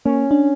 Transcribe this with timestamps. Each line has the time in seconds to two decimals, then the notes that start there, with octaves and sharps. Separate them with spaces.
0.05 A#3 C#4
0.31 D4